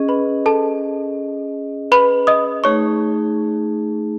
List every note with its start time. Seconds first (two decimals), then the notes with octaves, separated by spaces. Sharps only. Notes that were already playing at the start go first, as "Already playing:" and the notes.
Already playing: C#4 G#4 D#5
0.09 B4 B5
0.46 A4 A5
1.92 B4 B5
2.27 D#5 D#6
2.64 A3 D#4 G#4 C#5 C#6